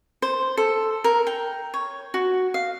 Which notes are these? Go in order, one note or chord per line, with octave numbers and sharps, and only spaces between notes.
C5
A4
A#4
G5
C#5
F#4
F5